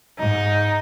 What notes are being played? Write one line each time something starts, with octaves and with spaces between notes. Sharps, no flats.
G#2 D#4